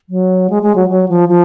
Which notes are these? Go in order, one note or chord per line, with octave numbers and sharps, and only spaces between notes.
F#3
G#3
G#3
F#3
F#3
F3
F3